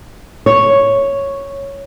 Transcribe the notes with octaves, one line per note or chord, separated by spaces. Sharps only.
C#5